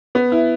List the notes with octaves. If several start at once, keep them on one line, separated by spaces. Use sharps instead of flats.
B3
E4